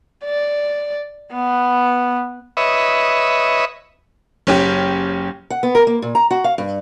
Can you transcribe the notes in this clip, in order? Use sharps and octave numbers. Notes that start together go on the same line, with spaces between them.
D5
B3
B4 C#5 D#5 E5
F#1 C#4 G4
F#5
B3
A#4
A#3
A#2
A#5
F#4
F5
G2